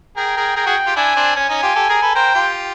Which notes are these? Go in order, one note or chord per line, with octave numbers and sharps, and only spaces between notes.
G#4 A#4 G5
G#4 A#4
G#4 A#4 G5
F#4 G#4
F4 G4
D4 E4 G#5
C4 D4
C#4 G#5
C#4 D#4
F4 G4
G4 A4
G#4 A#4
A4 B4
A#4 C5 G5
F4 G4